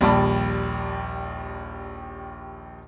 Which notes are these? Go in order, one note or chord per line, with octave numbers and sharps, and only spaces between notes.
A#1 D#2 G3 D5 A5 B5